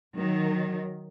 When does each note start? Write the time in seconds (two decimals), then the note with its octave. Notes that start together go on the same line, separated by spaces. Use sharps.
0.17 D#3 F#3